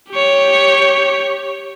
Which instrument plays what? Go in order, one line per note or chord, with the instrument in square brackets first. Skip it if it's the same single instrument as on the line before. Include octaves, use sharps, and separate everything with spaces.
[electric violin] G4 C#5